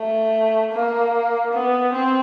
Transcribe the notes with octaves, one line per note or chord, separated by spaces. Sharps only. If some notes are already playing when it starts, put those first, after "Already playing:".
Already playing: A3
A#3
B3
C4